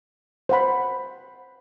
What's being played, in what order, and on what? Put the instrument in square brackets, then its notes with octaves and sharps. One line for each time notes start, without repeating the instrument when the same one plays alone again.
[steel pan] C5 F#5 B5